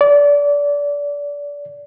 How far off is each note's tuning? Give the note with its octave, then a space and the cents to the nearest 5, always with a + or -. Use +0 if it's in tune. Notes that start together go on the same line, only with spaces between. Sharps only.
D5 -25